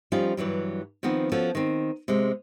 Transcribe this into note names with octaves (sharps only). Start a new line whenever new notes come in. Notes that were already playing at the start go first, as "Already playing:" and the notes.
F3 G3 C#4 D#4 F4
G2 E3 F#3 G3
D#3 F3 B3 C4
F3 C#4 F#4 A4
D#3 C4
C3 G#3